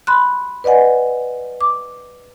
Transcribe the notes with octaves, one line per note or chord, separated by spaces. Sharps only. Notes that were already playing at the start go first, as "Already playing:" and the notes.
B5 C6 F#6
B4 D5 D#5 F#5 G#5
D6